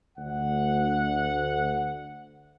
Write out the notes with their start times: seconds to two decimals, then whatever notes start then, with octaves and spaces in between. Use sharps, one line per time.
0.18 D2 F#5